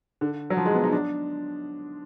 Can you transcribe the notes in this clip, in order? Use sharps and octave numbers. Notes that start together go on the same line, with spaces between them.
D3
F#3
F3
G#3
B3
D#4
D4